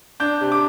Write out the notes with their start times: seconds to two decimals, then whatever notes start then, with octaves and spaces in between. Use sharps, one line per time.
0.20 D4 G6
0.41 C3
0.52 D6